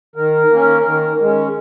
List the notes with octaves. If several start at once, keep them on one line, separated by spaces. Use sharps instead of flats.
D#3 A#4
A#3 C#4
D#3
G#3
C#4